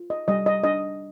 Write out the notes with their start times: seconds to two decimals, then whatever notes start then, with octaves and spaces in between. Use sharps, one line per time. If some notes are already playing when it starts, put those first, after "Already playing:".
Already playing: F4
0.10 D#5
0.28 G3 D#5
0.46 D#5
0.63 D4 D#5